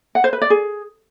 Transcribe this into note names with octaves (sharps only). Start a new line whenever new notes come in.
F#5
C5
B4
D5
G#4